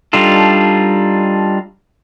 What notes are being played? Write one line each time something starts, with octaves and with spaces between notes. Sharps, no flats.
G3 D4 D#4 F4 A4